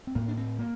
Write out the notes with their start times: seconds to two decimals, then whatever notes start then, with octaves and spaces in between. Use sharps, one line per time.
0.07 C4
0.15 A2 A#3
0.28 D4
0.37 C4
0.59 A#3